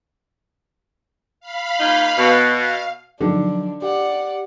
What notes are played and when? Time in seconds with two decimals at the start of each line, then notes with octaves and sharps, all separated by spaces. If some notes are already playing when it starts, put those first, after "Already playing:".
1.40 F5 B5
1.79 A#3 D#4 F4
2.17 B2
2.54 F5
3.21 D3 F3 F#3 D4 D#4
3.82 G4 D5 F#5